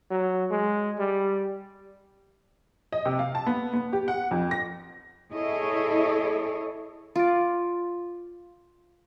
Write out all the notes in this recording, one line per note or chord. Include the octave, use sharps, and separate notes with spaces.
F#3
G#3
G3
D#5
C3
F5
A5
B3
B3
G4
F#5
F2
A#6
E4 G#4 A4 C#5 D#5
F4 D5